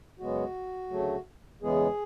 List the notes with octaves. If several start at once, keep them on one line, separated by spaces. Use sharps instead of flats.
F#2 C#3 G#3 B3 F#4
D2 C#3 F#3 A3
E2 C#3 E3 G#3 B3 G#4